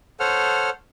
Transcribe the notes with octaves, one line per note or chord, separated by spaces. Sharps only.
A4 C5 C#5 F#5 F6